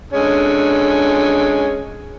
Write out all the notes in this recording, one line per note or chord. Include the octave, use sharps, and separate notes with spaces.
D3 G#3 C#4